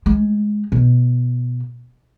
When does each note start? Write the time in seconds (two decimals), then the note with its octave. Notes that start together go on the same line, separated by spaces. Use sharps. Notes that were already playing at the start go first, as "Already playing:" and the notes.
0.06 G#3
0.72 B2